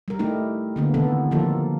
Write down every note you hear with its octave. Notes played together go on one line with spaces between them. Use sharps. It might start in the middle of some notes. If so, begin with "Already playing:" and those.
G3 A#4
A3 D#4 E4 G4
D3 A#3 B3
C3 D#3 E3 B3 A4
D#3 F3 A#3 F4 A4